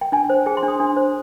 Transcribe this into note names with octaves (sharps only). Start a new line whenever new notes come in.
G5
D4 G#5
C5
G#4 G#5
C6
D4
D#6
D4
C5